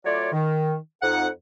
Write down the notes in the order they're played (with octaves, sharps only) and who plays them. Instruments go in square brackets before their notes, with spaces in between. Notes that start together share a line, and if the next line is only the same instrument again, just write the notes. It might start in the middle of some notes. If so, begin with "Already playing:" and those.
[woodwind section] F#3 A3 F4 C#5 D5
D#3
F2 D#4 F#5